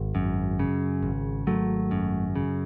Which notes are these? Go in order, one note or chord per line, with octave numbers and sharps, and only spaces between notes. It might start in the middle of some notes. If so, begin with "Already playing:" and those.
Already playing: G#1
F#2
C#3
G#1
G#1 F#3 A3
F#2
C#3